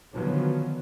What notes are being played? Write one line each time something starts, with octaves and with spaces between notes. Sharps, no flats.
D3 D#3 F3 F#3 B3 C#4